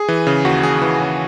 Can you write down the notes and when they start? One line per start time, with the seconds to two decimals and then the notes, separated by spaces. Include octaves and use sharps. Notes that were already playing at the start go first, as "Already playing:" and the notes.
Already playing: G#4
0.08 E3
0.27 C#3
0.45 D#2 F#4
0.63 D#2 G#4
0.82 E3
1.00 C#3